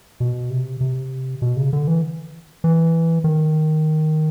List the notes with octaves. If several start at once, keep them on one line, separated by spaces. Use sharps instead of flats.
B2
C3
C3
B2
C#3
D3
E3
E3
D#3